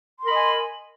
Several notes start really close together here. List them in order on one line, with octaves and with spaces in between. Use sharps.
C6 A#4 B5 D#5 G#5